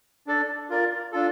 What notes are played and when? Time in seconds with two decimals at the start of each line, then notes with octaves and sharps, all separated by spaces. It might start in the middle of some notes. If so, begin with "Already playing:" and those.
0.27 D4 A4 D5
0.70 F4 A#4 D5
1.12 D4 F4 A4